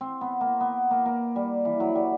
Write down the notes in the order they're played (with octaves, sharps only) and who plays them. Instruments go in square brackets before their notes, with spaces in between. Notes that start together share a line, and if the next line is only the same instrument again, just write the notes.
[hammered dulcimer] C4
B3
A#3
B3
A#3
A#3
G3
E3
F#3
G3